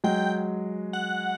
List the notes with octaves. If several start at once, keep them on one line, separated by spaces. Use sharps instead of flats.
F#3 G#3 G5
F#5